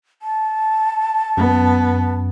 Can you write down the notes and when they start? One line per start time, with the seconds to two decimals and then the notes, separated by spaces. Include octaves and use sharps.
0.22 A5
1.37 F#2 B3